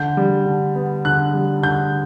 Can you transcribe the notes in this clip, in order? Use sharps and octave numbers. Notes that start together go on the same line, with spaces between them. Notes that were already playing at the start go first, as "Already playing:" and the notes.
Already playing: D3 G6
G3
D3
B3
D3 F#6
G3
D3 G6